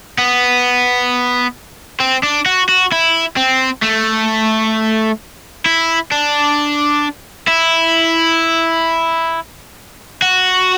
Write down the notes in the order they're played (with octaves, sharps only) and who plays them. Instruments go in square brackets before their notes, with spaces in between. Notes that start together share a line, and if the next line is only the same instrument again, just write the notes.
[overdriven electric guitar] B3
C4
D4
F#4
F#4
E4
C4
A3
E4
D4
E4
F#4